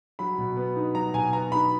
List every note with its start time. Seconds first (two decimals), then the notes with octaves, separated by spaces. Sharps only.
0.19 F#3 B5
0.38 B2
0.57 B3
0.76 D#4
0.95 F#3 A#5
1.14 B2 G#5
1.33 B3 A#5
1.52 D#4 B5